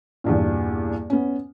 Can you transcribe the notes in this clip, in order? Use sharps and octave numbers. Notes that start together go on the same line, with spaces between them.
E2 G2 A#2
B3 C#4